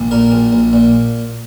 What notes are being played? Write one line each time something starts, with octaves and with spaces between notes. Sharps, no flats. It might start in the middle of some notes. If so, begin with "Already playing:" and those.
Already playing: A#1
A#2 A#4
A#1
A#1
A#2